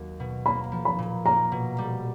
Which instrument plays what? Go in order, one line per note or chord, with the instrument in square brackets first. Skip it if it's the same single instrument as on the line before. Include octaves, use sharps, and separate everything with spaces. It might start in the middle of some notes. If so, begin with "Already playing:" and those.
Already playing: [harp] D#2 F#3
B2
[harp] A#3 [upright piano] B5
[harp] F3
[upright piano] B5
[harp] A#2
[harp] A#3 [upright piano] A#5
[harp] B2
G3